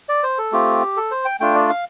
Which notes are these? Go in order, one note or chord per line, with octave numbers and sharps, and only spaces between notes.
D5
C5
A4
A3 C4 F4 G4
A4
C5
G5
A3 D4 F4 G5
D5
F5